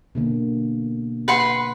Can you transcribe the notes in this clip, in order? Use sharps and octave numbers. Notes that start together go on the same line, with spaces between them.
B2 D3 A#3
B4 F#5 C6